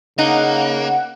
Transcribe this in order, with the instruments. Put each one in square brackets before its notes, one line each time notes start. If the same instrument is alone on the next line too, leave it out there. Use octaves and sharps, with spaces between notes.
[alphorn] C#3 [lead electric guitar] A#3 [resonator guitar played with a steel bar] D#4 [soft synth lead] F#5